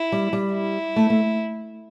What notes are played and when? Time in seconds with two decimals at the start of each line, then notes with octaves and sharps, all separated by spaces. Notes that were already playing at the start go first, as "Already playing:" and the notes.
Already playing: E4
0.12 G3
0.33 G3
0.53 E4
0.96 A3
1.10 A3